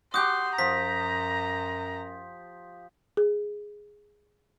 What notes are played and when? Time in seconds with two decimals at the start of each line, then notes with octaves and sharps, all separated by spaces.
0.14 F#4 G4 C6 D#6 G6
0.58 F#2 F3 A#5 B6
3.17 G#4